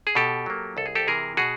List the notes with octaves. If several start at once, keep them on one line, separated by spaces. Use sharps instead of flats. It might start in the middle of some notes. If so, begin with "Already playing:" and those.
G#4
B2 G4 A4
F#3 A#3
C2 A4
G#4
G4 A4
C3 E3 G#4 A#4
B2 F#4 G#4